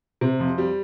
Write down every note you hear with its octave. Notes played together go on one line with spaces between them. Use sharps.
C3
F2
G3